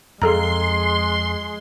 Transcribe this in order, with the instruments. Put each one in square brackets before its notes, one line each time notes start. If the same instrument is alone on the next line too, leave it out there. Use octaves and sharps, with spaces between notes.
[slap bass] F2 [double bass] G#3 [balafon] G#4 A4 A#5 [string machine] C6